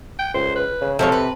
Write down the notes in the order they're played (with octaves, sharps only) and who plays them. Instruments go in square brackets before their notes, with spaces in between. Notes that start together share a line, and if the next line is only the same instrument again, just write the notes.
[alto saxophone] G5
[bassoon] C#2 [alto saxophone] C5
[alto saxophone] B4
[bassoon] C#3
[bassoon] C3 [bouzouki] F3 G#3 C#5 [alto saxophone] A4
[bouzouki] B4